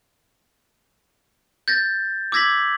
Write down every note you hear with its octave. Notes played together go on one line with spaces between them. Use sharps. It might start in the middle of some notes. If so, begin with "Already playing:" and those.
G6 A6 A#6
D6 E6 G#6 A#6 B6 F#7